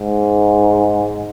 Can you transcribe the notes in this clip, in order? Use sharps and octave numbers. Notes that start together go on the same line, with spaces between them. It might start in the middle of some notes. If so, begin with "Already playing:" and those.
Already playing: G#2